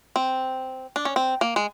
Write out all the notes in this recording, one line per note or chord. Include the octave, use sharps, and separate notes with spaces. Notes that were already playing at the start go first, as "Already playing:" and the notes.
C4
D4
C#4
C4
A#3
G#3